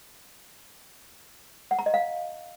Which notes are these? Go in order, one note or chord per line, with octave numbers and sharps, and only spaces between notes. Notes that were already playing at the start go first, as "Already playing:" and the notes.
F#5
A#5
D#5
F5